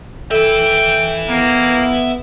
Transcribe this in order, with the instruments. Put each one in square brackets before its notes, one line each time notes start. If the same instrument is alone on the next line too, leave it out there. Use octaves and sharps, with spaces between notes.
[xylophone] A4 [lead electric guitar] B4 E5 [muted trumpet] G5
[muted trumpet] A#3 [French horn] B3